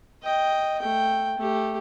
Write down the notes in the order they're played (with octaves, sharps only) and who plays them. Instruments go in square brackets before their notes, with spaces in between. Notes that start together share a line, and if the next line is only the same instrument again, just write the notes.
[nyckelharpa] D#5 G5
A3 G5
A3 G4